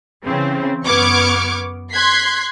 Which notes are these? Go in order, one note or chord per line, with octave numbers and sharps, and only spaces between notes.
C#3 E3 C4
F#2 B3 C#6 D6 F6 G#6
C6 F#6 G#6 B6 C7